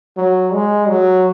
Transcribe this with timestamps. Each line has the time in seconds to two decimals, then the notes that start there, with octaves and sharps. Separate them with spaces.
0.17 F#3
0.53 G#3
0.88 F#3